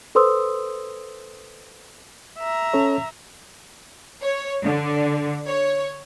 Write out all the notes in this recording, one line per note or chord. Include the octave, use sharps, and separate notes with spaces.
A4 B4 C5 C6 D#6 E6
E5 A#5
C#4 A4 C#5
C#5
D3
C#5